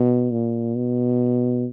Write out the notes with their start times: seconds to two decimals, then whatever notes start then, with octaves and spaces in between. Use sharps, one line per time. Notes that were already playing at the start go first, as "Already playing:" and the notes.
Already playing: B2
0.31 A#2
0.76 B2